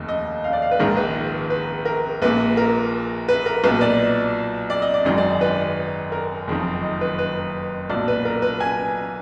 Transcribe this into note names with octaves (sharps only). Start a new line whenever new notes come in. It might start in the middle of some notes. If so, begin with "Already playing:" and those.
Already playing: F1 D#2 D#3
D#5
F5
D5
F5
B4
A#1 G#2 D#3 A#4
B4
B4
A#4
A#1 A#2 B4
A#4
B4
A#4
B1 A#2 B4
D5
D5
D#5
D5
G#1 F#2 D#3 D#5
D5
B4
A#4
F#1 F2 D#3
D#5
B4
B4
B1 A#2 D5
B4
A#4
B4
G#5